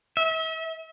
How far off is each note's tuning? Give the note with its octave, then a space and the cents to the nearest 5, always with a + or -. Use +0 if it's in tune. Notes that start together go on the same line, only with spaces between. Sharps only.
E5 -40